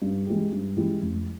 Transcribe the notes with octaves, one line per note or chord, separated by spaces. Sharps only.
G2
E3 G#3 E4 G4
G2
E3 G#3 E4 G4
F1